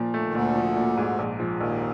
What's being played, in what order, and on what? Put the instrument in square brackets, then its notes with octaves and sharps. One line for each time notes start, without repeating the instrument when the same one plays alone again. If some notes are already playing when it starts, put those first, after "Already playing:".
Already playing: [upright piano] A#2 F3
A3
[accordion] D#3
[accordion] D2 D3 [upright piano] A#2
[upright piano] F3
A#2
G#2
A#1
F3
[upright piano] A#1 [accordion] D#2 D#3